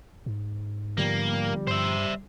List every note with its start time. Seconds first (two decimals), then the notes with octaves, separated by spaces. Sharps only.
0.26 G#2
0.98 D3 F3 G3 A#3 B3
1.67 G2 C5 E5